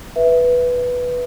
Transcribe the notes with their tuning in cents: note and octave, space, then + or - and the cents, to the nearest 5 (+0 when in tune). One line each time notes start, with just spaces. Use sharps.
B4 -5 E5 +0